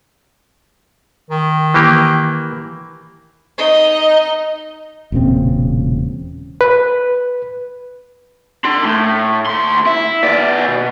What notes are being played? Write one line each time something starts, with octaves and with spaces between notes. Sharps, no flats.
D#3
E3 A#3 G4
D#4 D#5
E1 A#2 C#3 C4
B4
D4 C6
A2
D2 C6
E4
B3 D5
B2